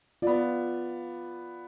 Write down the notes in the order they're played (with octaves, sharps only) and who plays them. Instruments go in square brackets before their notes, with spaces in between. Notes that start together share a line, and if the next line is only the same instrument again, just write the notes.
[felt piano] B3 D5 [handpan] F4